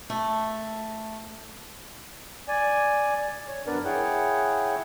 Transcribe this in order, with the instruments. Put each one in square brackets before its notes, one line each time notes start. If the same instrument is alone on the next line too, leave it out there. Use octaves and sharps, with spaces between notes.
[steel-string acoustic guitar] A3
[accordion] D5 G#5
C#5
F#2 B3 D4 A#4 B4 D5
E4 G#4 C#5 F#5 G5